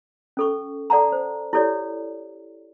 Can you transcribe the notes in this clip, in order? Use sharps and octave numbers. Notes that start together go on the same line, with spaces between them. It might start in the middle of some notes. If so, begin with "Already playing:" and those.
C#4 A4 C#6
A4 D5 F#5 A5 A#5
C5
E4 G4 A4 C#5 D5